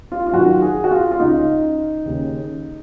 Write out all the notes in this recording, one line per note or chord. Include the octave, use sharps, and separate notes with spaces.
F4
F4
F#2 D#3 F#4
G#4
F#4
F4
F4
C#2 C#3 D#4
D#2 C#3